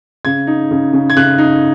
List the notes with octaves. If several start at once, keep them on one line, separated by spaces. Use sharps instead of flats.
C#3 G#6
D#4
C#3
C#3
G#6
C#3 F#6
D#4